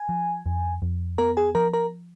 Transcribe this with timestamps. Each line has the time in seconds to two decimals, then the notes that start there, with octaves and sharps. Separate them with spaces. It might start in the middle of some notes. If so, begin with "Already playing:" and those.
Already playing: G#5
0.09 F3
0.46 F2
0.82 F2
1.18 B3 A#4 A#5
1.37 G#4 G#5
1.55 F3 A#4 A#5
1.73 A#4 A#5